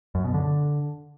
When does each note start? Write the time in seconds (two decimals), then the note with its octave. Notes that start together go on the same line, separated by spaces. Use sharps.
0.15 F#2
0.24 B2
0.34 D3